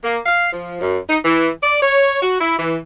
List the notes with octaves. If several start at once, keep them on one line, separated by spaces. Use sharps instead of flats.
A#3
F5
F3
F#2
D#4
E3
D5
C#5
F#4
E4
E3